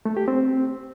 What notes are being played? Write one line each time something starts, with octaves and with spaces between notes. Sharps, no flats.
A3
G4
C4